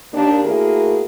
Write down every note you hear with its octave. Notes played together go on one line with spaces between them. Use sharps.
D#2 D4
A3 A#3 E4 F#4 G#4 A#4